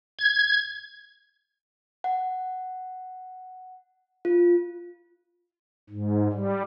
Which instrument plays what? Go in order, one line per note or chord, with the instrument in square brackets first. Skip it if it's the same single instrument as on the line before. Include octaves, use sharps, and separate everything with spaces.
[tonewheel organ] G#6
[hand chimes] F#5
F4
[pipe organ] G#2
G3